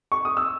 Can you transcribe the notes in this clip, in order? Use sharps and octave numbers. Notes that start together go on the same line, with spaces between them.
C#6
D#6
E6